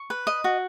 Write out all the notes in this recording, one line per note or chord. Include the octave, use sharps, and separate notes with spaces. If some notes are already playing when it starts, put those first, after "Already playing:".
Already playing: C#6
B4
D#5
F#4